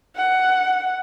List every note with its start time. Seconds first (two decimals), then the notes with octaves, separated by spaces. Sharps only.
0.16 F#5